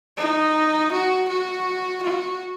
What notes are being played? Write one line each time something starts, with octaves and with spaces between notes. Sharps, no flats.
D#4
F#4
F#4
F#4